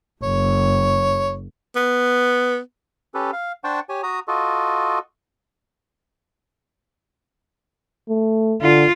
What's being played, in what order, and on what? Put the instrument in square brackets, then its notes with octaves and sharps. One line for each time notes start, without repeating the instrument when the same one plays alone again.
[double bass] F#1 [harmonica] C#5
[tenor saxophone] B3
[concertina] C#4 G4 A4 B4
F5
D4 C5 F#5 G5 A5 C#6
G4 C#5 G#5
F#4 A#5 D#6
F4 F#4 A4 D#5
[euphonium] A3
[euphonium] D3 [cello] F4